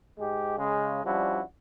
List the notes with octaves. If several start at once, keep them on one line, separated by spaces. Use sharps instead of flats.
G#2 G#3 G4
C#3 G#3
F3 G3 C#4 D4 E4 F#4